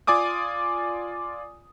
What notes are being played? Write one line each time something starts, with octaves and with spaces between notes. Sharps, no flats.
F4 D5 G#5 D6 D#6